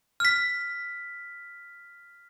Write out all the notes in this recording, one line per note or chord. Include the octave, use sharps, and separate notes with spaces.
F6 B6